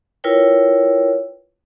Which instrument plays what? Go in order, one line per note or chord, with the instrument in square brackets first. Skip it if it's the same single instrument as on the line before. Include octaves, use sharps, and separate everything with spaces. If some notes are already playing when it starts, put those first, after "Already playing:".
[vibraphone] E4 F4 A#4 B4 C#5 G5